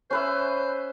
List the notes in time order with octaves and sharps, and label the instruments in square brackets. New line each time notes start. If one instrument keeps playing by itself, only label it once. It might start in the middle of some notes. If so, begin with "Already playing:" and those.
[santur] C#4 B4 E5 [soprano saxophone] C5